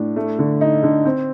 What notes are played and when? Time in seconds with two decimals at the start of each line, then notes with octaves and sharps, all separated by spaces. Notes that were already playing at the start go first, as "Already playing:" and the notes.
Already playing: A2 D4
0.16 A3
0.39 D3
0.61 D#4
0.83 D3
1.05 C4